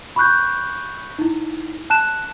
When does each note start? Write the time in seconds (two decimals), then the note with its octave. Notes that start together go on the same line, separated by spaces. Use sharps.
0.16 B5 C#6 F#6 G6
1.19 D#4 E4
1.90 A5 F#6 E7